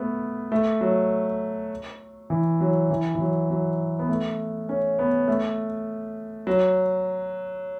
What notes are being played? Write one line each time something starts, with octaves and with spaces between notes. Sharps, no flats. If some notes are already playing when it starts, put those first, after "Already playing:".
Already playing: A3 B3
A3
F#3
E3
F#3
E3
E3
F#3
F#3
B3
A3
C#4
B3
A3
F#3